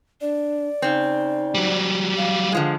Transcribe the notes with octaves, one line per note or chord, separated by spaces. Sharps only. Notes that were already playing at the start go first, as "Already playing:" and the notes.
D4 D5
C#3 C4 D#4
F#3 G3
F5
D3 F3 G#3